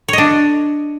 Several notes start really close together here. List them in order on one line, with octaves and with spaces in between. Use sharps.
C#5 D#5 D4